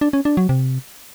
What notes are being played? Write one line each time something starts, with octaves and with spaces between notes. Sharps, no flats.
D4
C#4
D4
F#3
C3